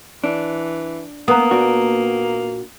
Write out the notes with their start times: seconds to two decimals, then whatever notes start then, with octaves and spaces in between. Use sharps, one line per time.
0.24 E3 D4
1.28 A#3 B3 A#5 D#6
1.51 A#2 D4 F#4